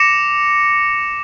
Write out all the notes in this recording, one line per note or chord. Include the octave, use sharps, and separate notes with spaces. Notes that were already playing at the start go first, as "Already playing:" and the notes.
Already playing: D6 A#6 C#7 E7